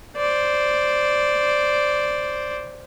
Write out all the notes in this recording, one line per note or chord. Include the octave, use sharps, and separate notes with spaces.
C5 D5